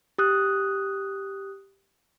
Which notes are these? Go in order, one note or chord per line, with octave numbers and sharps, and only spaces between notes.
G4 D#6 F#6